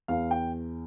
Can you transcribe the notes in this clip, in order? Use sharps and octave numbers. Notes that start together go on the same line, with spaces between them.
E2 F5
G5